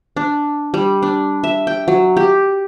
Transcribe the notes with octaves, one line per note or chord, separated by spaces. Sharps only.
D4
G3
D4
E5
G5
F#3
G4